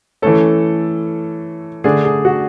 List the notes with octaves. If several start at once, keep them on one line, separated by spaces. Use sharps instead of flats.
E3 A3 C#4 A4
D3 A3 D4 G#4
G#4
F#4